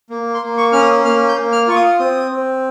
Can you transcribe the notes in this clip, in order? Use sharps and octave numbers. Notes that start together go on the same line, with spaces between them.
A#3
C6
A#3
C#6
C#4 F6
D#6
A#3 F6
G6
A#3
F6
F4 C#6
D#6
C4 D#6
C4